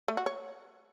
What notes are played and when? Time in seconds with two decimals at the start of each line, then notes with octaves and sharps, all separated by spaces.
0.08 A3
0.17 F#4
0.26 C#5